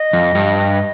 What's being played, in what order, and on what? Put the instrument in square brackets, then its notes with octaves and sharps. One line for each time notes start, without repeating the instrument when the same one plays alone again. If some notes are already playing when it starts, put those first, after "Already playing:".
Already playing: [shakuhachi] D#5
[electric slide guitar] F2
G2